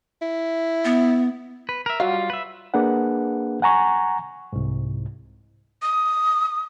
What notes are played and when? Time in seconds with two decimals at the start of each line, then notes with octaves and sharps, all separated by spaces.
0.22 E4
0.85 B3
1.69 B4
1.86 A#4 E5
2.00 F#3 G3 F4 F#4 F5
2.30 B4 E5
2.74 A#3 D4 G#4 B4 F#5
3.62 F#5 G#5 A#5 C#6
4.53 C2 G#2
5.82 D#6